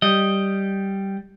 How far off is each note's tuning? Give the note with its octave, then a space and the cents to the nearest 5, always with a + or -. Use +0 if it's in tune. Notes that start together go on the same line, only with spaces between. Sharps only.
G3 -5 D#5 +0